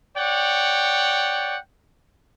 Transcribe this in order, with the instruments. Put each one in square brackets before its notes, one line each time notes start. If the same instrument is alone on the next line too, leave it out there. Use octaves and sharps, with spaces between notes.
[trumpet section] C#5 D5 F#5 G5